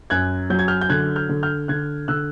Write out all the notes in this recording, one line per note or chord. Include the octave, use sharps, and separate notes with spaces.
F#2 F#6 G#6
F#3 G6
G#6
F6 G6
G6
D3 F#6 G#6
F6 G6
D3
F6 G6
D3 F#6 G#6
D3 E6 F#6